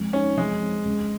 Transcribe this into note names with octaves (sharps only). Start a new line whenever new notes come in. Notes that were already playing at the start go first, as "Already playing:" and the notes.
Already playing: F2 G#3
C#4 D#4
F2 G#3
C4
C#2